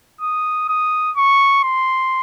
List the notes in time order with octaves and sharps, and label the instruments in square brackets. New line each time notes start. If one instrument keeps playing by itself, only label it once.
[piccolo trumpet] D#6
D#6
C#6
C6